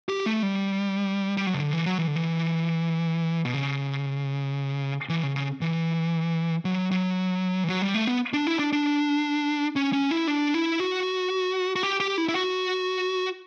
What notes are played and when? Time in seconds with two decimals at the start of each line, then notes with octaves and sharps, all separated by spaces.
0.09 G4
0.26 A3
0.43 G3
1.37 G3
1.47 F#3
1.54 C#3
1.60 D3
1.73 E3
1.86 F#3
1.98 E3
2.07 D3
2.15 E3
3.45 B2
3.54 C#3
5.09 E3
5.23 C#3
5.36 C#3
5.61 E3
6.65 F#3
6.91 F#3
7.64 E3
7.68 F#3
7.82 G3
7.94 A3
8.07 B3
8.33 D4
8.47 E4
8.59 D4
8.73 D4
9.76 C#4
9.93 C#4
10.11 E4
10.27 D4
10.54 E4
10.80 F#4
11.76 F#4
11.83 G4
12.00 G4
12.18 E4
12.28 E4
12.35 F#4